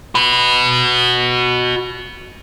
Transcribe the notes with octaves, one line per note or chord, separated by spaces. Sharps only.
F#4 B4